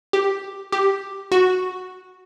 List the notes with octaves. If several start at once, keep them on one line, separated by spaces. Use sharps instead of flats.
G4
G4
F#4